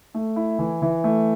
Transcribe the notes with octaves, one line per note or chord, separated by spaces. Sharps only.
A3
E4
E3
E3
A3